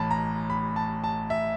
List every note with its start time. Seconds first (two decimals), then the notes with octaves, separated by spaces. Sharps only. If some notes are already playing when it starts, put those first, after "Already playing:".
Already playing: A1 A2 E3 A5 B5
0.11 A#5
0.50 B5
0.76 A5
1.04 A5
1.30 E5